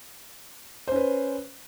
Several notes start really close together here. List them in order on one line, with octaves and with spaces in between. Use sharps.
C5 C#4 B4